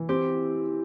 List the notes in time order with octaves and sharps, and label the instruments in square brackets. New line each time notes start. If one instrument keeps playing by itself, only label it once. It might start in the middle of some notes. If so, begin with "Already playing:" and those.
Already playing: [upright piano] E3
[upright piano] C4 [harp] G4